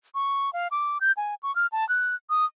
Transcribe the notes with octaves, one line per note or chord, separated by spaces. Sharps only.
C#6
F5
D6
G6
G#5
C#6
F6
A5
F#6
D#6